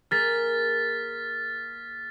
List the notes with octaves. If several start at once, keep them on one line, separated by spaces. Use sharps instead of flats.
A#3 G#4 F6 A6 B6